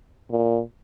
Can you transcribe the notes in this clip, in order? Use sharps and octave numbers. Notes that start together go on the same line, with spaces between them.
A#2